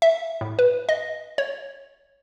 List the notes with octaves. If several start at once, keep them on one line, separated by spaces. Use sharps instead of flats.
E5
A2
B4
D#5
C#5